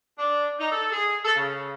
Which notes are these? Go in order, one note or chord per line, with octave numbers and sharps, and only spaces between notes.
D4
D#4
A4
G#4
A4
C#3